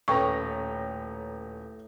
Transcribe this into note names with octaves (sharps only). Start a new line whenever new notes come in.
D#1 A2 C#4 A4 B4 G5 A#5 C#6